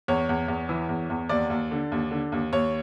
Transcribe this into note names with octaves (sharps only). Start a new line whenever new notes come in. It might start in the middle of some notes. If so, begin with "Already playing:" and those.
E2 C#5
E2
E2
E3
E2
E2
D#2 D5
D#2
D3
D#2
D3
D#2
D#2 C#5